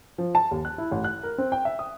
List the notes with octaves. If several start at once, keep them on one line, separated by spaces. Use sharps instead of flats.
F3
A5
D#2
F#6
E4
A1
F#6
A#4
C4
G5
E5
D#6